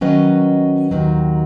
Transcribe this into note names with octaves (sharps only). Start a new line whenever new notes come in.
D#3 F#3 C#4 B4 D#5
D#2 D#3 F#3